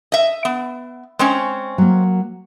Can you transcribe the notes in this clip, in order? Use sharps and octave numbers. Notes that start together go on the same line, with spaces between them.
D#5 E5
B3
G#3 C4 C#4
F#3 A#3